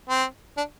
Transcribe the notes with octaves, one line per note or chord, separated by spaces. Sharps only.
C4
D4